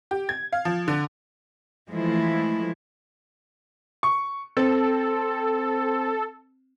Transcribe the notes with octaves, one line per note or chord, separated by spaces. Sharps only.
G4
G#6
F5
F3
D3
E3 F3 G#3 A3 E4
C#6
C4 A4